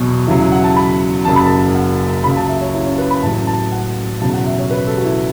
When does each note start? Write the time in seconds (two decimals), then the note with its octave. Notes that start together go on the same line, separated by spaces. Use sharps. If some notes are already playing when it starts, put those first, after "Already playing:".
Already playing: E2 B2 F#3
0.27 E2 C#3 F#3 E4
0.39 E4
0.52 F#5
0.64 A5
0.76 B5
1.25 F#1 F#2 F#3 A5
1.36 B5
1.46 A5
1.75 F#5
2.24 C#2 C#3 F#3 B5
2.36 A5
2.49 E5
2.61 C#5
2.73 E4
2.86 C#4
2.98 B4
3.10 B5
3.23 A1 A2 F#3 A5
3.47 A5
3.72 F#5
4.21 E1 E2 C#3 F#3 A5
4.33 F#5
4.46 E5
4.58 C#5
4.71 B4
4.87 A4
4.97 F#4
5.04 E4